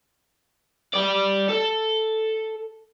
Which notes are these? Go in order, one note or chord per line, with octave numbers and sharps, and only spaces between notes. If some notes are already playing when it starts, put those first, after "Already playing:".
G4 D5
A4